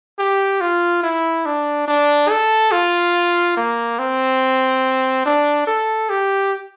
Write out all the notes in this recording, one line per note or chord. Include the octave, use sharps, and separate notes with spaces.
G4
F4
E4
D4
D4
A4
F4
A#3
C4
D4
A4
G4